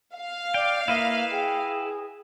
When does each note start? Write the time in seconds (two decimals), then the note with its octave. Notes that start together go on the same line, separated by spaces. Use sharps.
0.15 F5
0.54 D5 G5
0.88 A#3 E4 B4 D#5 E5
1.31 G#4 G5